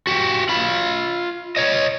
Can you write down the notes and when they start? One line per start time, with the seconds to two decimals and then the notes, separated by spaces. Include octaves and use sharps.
0.07 F#4 G4
0.49 F4 B5
1.57 C#5 D#5